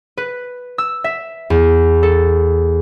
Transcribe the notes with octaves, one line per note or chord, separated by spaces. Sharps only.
B4
E6
E5
E2
A4